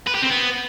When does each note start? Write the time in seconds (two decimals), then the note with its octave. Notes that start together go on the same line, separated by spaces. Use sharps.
0.07 B4
0.15 G4
0.22 C4
0.30 B3